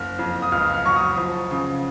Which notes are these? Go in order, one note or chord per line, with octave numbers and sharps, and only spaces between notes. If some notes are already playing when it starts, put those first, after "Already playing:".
Already playing: F#1 F6
F2
D#6
C#2 F6
F6
F#3 C#6
D#6
F3
C#3